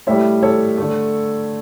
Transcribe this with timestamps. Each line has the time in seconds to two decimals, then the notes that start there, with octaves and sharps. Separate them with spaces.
0.07 A2 G3 C#5 E5
0.43 A4 C#5
0.78 D3 A3